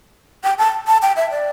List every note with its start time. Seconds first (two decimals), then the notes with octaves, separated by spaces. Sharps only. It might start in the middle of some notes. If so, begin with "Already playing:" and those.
0.44 G5
0.58 A5
0.87 A5
1.02 G5
1.16 E5
1.31 D5